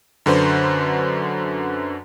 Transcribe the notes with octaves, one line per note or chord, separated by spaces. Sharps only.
F#2 D3 F#4 B4 C5